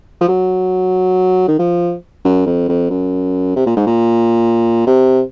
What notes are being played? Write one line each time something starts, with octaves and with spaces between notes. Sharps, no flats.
F3
F#3
D#3
F3
F#2
F2
F2
F#2
C3
A#2
G#2
A#2
C3